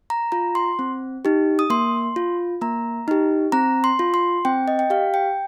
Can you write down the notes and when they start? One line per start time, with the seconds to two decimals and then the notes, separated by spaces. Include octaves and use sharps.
0.10 A#5
0.32 F4 A#5
0.55 C6
0.79 C4
1.25 D#4 G4
1.59 D#6
1.70 A#3 C6
2.16 F4
2.61 A#3 A#5
3.08 D#4 G4
3.52 C4 A#5
3.84 C6
3.99 F4
4.14 C6
4.45 C4 G5
4.68 D#5
4.79 G5
4.90 G4 F5
5.14 G5